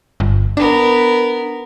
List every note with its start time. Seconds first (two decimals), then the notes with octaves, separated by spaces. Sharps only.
0.20 G1
0.57 B3 D4 A#4